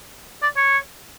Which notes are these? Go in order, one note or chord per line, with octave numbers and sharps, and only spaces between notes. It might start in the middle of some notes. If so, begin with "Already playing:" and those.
D5
C#5